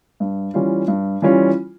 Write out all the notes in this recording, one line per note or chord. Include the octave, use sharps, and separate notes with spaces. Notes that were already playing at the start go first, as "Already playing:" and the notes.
G2
E3 G3 C#4 F4
G2
E3 G3 C#4 F4